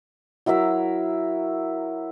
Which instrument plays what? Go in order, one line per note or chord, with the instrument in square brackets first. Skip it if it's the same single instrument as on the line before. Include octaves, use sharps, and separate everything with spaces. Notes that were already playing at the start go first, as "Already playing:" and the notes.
[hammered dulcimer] F#3 E4 A#4 E5